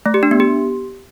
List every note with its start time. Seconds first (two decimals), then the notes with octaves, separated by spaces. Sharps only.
0.06 A3
0.14 G4
0.23 D4
0.31 B3
0.40 G4